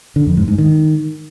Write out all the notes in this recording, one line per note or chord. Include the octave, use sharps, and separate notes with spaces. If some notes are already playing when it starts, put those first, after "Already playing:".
D3
F2
G#2
G#2
D#3